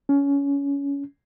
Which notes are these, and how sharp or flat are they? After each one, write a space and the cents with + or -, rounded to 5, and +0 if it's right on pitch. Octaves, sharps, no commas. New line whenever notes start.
C#4 +20